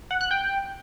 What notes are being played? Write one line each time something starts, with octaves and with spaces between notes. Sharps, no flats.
F#5
F#6
G5